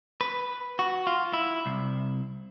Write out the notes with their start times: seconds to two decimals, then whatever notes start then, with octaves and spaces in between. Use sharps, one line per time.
0.21 B4
0.79 F#4
1.07 F4
1.33 E4
1.66 C2